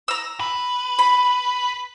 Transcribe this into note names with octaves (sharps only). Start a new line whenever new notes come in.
A#5 E6
B4
B5